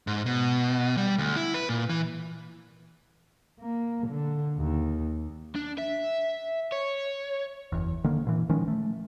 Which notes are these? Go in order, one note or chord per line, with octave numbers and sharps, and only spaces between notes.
G#2
B2
G3
D2
E4
B4
A#2
E3
A#3
D3
D#2
D4
E5
C#5
F#1 E2
D3 D#3 A#3
A#2 E3
D#3 F3 G#3 C#4
A3